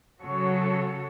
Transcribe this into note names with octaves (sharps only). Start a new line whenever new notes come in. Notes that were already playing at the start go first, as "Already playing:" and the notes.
C#3 F#3 F#4 A4 C#5